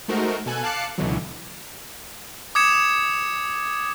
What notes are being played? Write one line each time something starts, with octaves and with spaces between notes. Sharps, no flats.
G#3 A3 D#4 F#4 A#4 C5
B2 A4 G#5 F#6 G#6
F5 A5 D6 F#6 C7 C#7
C#2 B2 D3 E3 F#3
D6 D#6 G#6 C#7 E7